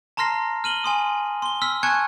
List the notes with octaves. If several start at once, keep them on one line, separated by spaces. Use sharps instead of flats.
A5 A#5 C6 F6 A#6 C7
F6 D#7 F#7 G7
G#5 C6 D#6
C6 G7
E6 F6 B6
G#5 A5 C#6 F#6 G#6 C#7